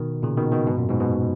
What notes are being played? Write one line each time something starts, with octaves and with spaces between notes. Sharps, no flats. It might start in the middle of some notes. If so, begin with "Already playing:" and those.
Already playing: B2 D#3
A#2 C#3
B2 D#3
B2 D#3
G#2 B2
F#2 A#2
G#2 B2
G#2 B2